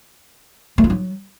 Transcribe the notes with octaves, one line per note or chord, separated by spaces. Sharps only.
A3
F4
F#3